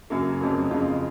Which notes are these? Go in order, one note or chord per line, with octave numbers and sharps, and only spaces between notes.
F#2 C#3 F#3 A#3
F2 C#3 F#3 A#3
F2 C#3 G#3 F4